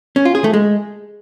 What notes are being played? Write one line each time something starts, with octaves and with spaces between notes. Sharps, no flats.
C#4
F4
G#4
A3
G#3